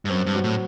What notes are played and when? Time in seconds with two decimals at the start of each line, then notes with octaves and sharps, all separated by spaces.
0.05 G2
0.10 F#2 C4
0.26 G2
0.35 F#3
0.44 A2